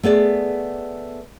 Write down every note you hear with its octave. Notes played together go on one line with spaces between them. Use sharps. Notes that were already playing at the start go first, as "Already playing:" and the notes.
A3 B3 G#4 D5